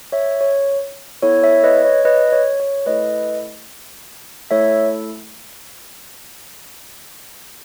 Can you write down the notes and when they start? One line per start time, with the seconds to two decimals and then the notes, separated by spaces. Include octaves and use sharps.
0.12 C#5 E5
0.41 C#5
1.23 B3 E4 A4 C#5
1.43 C#5 E5
1.64 B4 D#5
1.85 C#5
2.05 B4 D#5
2.32 C#5
2.60 C#5
2.86 A3 E4 A4 B4 D#5
4.51 A3 E4 A4 C#5 E5